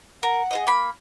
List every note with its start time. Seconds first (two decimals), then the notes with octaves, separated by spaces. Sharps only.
0.23 A#4 F#5
0.51 G#4 C5 D#5
0.67 A#3 B5